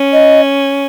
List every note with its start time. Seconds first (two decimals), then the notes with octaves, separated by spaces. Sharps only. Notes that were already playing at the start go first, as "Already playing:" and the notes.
Already playing: C#4
0.13 D#5